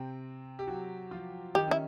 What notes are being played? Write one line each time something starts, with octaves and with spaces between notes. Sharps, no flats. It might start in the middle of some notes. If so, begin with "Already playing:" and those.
Already playing: C3 C4
G4
F#3 F#4
F3 F4
D#3 D#4 G4
C#4 E4